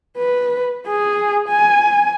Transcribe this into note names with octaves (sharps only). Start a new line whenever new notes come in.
B4
G#4
G#5